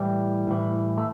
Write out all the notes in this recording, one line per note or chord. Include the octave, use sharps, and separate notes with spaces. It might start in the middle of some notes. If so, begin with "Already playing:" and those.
Already playing: A2 E3 G3
A2 E3
A3